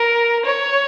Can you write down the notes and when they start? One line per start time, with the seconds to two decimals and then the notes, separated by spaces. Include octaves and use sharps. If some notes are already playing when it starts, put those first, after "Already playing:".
Already playing: A#4
0.45 C#5